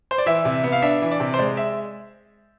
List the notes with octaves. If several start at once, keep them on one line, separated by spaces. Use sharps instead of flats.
C5
D5
E3 E5
C3
B3
F5
D4 E5
E3
D5
C3
C5
G#3 D5
E5